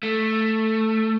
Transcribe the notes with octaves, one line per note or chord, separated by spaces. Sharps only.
A3